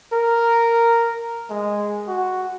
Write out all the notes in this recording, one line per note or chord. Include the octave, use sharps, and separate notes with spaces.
A#4
G#3
F#4